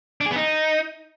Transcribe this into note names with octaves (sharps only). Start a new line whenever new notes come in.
D4
G#4
B3
D#4